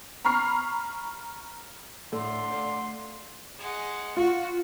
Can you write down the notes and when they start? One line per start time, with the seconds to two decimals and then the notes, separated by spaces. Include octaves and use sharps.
0.25 A#5 B5 C#6 F6 C7
2.13 A2 D3 A3 C6
2.50 C5 D5 F5
3.59 G#3 F#5
4.17 F4 F#4